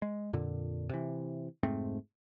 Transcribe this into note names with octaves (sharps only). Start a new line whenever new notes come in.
G#3
F2 A#2 D3
C3 E3
F1 G#2 A3 C4